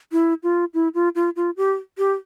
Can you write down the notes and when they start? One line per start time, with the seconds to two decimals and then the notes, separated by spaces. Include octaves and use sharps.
0.12 E4
0.43 F4
0.74 E4
0.94 F4
1.15 F4
1.36 F4
1.57 G4
1.98 G4